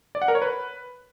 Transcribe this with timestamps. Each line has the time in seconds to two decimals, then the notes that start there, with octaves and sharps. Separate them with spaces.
0.15 D5
0.22 F#5
0.28 A#4
0.35 C#5
0.42 B4